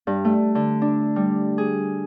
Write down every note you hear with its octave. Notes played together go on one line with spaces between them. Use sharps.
G2
A3
D3
D4
G3
G#4